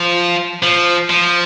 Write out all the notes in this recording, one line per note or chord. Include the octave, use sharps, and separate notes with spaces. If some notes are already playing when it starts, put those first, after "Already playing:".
Already playing: F3
F3
F3